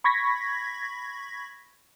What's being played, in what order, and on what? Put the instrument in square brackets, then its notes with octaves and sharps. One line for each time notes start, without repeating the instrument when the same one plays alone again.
[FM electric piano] B5 C#6 G#6 A#6 B6